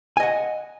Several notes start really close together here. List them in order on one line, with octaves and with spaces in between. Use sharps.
G#5 D#5 F#5